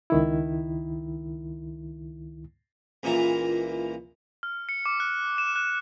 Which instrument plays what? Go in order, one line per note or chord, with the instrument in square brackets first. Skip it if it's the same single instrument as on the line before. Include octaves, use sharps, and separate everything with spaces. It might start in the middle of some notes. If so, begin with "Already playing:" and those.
[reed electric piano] C#2 D#3 E4
[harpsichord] C#2 A#2 E3 A#5
[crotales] F6
C#7
D6
F#6
E7
F#6